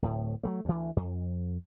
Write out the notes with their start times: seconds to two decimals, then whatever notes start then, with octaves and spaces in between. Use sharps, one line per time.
0.02 D1 A2
0.43 F#3 G3 A3
0.65 D2 E3
0.96 F2